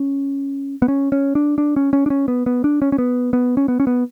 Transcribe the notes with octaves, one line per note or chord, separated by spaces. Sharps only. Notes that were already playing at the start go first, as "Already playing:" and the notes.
Already playing: C#4
B3
C#4
C#4
D4
D4
C#4
C#4
D4
C#4
B3
B3
D4
C#4
C#4
B3
B3
C#4
B3
C#4
B3